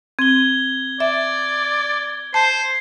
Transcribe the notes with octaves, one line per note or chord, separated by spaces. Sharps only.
C4 G#6 G7
D5 E5
C5 A5 C7